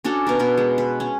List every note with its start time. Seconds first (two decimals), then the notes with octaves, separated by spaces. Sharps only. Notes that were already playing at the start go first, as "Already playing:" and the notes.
0.04 C#4 D4 F#4 A4
0.27 B2 A#4
0.39 B2 A#4 B4
0.57 G#3
0.78 B4
1.00 C#4